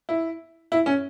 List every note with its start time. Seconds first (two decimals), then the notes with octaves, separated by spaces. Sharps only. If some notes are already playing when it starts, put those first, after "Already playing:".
0.09 E4
0.72 E4
0.86 C#4